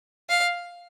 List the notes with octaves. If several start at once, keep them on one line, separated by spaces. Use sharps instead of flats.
F5